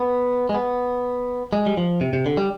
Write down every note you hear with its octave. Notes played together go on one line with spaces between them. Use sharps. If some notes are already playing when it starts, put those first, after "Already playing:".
Already playing: B3
G#3
B3
G#3
G3
F3
C3
C3
D3
G3